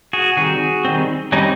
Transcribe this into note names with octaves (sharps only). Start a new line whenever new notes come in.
F#4 G#4
D#3 G3 C4 F#4 G#4
D#3 G3 C4
D#3 G3 C4 C#4 D#4